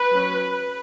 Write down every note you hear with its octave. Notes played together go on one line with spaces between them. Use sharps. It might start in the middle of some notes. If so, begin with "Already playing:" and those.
Already playing: B4
F#3 C#4